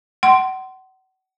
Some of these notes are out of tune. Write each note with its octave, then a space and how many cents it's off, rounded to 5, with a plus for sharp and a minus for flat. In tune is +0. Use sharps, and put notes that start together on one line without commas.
F#5 +35 C6 -5